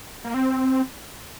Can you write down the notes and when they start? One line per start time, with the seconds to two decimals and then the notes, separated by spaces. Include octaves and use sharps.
0.25 A#3
0.34 C4